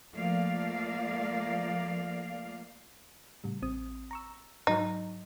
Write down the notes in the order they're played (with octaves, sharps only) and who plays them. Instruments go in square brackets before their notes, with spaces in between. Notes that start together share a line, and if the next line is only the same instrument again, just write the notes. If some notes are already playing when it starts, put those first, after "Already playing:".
[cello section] F3 A3 A#3 D5 F5
[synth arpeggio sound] A2 C#3 G3
A1 C4 D#6
A#5 C#6 E6
[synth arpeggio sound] G#2 F#3 [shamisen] D#4